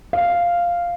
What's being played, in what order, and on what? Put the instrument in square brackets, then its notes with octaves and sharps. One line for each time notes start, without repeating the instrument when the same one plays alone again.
[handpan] F5